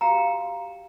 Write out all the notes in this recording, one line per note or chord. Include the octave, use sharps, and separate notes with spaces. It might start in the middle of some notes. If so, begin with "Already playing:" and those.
F#4 G4 F5 G5 A#5